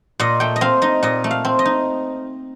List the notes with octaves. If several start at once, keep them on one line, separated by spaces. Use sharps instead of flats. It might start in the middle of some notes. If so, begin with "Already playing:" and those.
A#2 D#5
A3 G5
D#5
C4 F5
D#4 D#5
A#2 D#5
A3
F5
C4
D#5
D#4